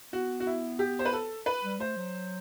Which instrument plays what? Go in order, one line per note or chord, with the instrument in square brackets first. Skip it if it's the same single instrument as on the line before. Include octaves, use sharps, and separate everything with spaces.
[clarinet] B3 [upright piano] F#4
[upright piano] F#4
E4
G4
C5
B4
A4
B4
[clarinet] G3
[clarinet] A3 [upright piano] C5
[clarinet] F#3